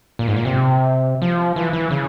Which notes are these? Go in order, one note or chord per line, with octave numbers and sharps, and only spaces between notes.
A#2
G#2
A#2
C3
F3
E3
E3
C#3